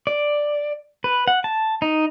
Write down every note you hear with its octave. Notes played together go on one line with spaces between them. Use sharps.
D5
B4
F#5
A5
D#4